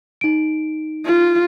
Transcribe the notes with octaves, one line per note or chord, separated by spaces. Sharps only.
D#4 D7
F4